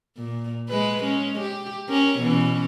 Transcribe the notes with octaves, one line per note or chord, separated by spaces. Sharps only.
A#2
G#3 B4
G#3 C#4
G4
C#4 A#4
B2 E3 C#4